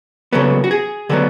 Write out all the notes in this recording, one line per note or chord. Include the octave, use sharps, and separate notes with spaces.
C#3 F#3 B3 A4
F#4
G#4
D3 F#3 B3 A4